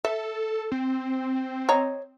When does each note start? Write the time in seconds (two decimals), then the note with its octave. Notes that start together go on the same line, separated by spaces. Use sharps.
0.05 A4 E5
0.72 C4
1.69 C#5 D#5 A#5